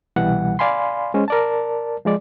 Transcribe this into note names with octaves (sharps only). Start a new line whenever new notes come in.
C2 B2 E3 G3 F#5
D5 F5 G#5 B5 C6
G#3 C#4 C5
A#4 D5 A5
F3 G#3 D5